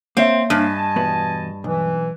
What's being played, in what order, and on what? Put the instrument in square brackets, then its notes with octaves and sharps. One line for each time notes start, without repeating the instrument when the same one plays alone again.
[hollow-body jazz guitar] A#3 C#5 E5 [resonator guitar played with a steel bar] C4
[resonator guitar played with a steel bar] G2 [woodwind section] D#5 G#5 A5
[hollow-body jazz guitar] E2 B2 B3
[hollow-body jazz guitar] B1 [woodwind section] E3